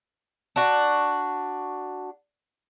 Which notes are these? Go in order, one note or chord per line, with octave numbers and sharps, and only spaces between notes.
D4 F#4